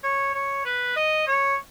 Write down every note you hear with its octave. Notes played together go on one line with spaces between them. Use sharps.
C#5
C#5
B4
D#5
C#5